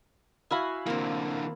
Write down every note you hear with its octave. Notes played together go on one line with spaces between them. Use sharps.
E4 F#4 E5 F5 G#5 B5
D3 E3 A#3 C4